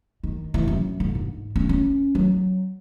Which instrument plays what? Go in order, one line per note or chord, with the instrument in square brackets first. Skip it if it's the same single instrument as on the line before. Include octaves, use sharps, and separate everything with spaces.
[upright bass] D#3
E3
F#2
D3
G#2
C#4
C#4
F#3